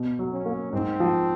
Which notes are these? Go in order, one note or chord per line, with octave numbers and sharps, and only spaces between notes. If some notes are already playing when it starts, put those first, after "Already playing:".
Already playing: B2
F#3
C#4
A#3
G#2 C4
F3